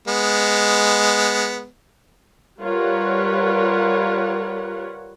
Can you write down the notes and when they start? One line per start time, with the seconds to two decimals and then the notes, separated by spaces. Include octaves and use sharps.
0.08 G#3 B3
2.61 G3 F4 A#4 B4 C#5 F#5